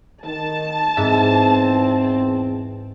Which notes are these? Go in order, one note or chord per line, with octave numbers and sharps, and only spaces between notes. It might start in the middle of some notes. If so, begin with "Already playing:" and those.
D#3 A5
E2 G#2 C4 E5